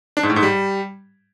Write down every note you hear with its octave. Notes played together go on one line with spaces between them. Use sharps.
D4
G#2
A2
G#2
G3